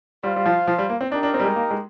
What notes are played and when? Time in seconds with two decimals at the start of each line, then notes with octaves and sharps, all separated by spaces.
0.23 G3 F4 C5 F5
0.36 G3
0.46 F3
0.68 F3
0.78 G3
0.90 A#3
1.01 C4
1.11 D4 D#4 G4 A#4
1.23 D4
1.34 C4
1.40 G3
1.45 G#3
1.56 A#3
1.71 G#3